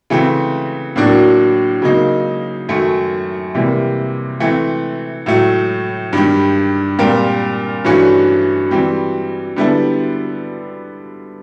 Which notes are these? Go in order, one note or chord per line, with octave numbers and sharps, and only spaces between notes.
C#3 E3 A3 C4
A2 F#3 A#3 D4 F#4
C#3 F#3 A#3 D#4
F#2 D#3 F#3 A3
C3 E3 G3 A#3
E3 A3 C4
A2 F#3 A3
G2 D#3 G3
A#2 G3 C4 F4 A#4
G2 E3 A3 C#4 F#4
E3 G3 C4
D3 G3 B3 E4 A4